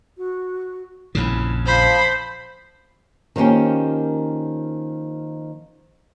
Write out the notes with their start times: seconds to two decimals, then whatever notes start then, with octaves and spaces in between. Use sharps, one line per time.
0.17 F#4
1.15 A#1 F2 C#3 E4
1.66 F3 C5 B5
3.36 D#3 F3 A#3 C#4 G4